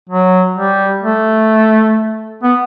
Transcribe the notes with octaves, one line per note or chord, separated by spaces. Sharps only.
F#3
G3
A3
B3